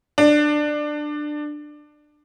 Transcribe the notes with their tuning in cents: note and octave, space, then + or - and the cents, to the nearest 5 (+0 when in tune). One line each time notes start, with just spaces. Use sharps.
D4 +20